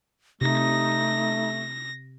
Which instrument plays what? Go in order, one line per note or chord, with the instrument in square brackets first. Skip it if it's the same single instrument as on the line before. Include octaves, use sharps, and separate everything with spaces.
[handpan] C3 [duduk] A3 [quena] D#4 [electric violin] A#6